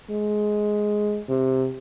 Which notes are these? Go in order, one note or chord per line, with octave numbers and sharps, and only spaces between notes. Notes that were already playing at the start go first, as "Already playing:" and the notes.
G#3
C3